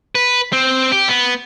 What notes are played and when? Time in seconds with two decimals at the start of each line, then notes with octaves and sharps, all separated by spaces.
0.15 B4
0.53 C4
0.92 G4
1.09 B3